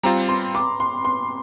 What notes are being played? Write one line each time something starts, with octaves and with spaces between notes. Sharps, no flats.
G3 C4 F4 A#5
C6
D6
C6
C6